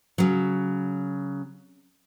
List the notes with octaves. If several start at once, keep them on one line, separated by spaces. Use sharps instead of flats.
C#3 F#3